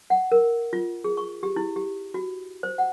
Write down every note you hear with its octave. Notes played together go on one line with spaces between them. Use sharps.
F#5
A#4
F4
G#4
C#6
G4
E4
G4
F#4
C5
F#5